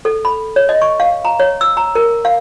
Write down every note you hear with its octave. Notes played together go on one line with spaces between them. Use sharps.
A4
B5
C#5
D#5
C#6
F5
A#5
C#5
E6
A#5
A#4
F5